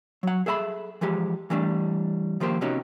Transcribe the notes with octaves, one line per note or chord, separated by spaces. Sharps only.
F#3 F#5
G#4 A4 E5 G#5 B5
E3 F3 G#3 G4
E3 G3 A3 D4
D#3 F3 A#3 G4 C5
C3 B3 C#4 D#4 F#4 G4